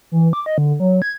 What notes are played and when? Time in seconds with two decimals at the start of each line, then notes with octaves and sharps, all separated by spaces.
0.12 E3
0.33 D6
0.46 D#5
0.58 D3
0.80 F#3
1.02 G#6